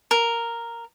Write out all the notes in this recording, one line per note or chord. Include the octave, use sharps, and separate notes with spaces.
A#4